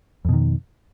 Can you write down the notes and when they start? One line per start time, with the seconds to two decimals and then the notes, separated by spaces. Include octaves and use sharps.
0.25 F2
0.29 B2
0.33 D#3